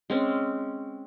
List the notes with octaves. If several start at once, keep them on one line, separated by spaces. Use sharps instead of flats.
G#3 C4 C#4